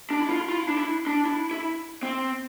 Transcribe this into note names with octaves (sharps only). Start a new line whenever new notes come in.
D4
E4
F4
E4
F4
E4
D4
E4
D4
E4
E4
C4